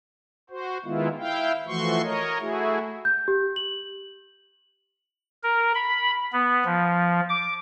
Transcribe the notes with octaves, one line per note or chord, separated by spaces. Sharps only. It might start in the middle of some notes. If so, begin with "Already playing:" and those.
F#4 C5
D#3 G#3 B3 E4 F4
E4 F5 G5
E3 F3 A3 F#4 C6 C#6
A#4 C#5 D#5
A3 E4 F#4 G#4
G6
G4
F#7
A#4
B5
B3
F3
D6